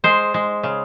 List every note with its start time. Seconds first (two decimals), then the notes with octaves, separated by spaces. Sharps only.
0.04 G#3 C5
0.34 G#3
0.63 C#3